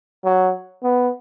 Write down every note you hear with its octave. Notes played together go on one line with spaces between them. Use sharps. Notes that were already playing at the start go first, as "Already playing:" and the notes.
F#3
B3